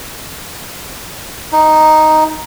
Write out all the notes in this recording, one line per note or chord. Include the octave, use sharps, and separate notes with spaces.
D#4